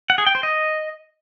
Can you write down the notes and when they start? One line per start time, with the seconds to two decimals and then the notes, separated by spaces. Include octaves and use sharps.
0.10 F#5
0.18 G#4
0.26 G5
0.35 C5
0.43 D#5